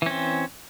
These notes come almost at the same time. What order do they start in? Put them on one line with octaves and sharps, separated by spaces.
E3 C#4 C4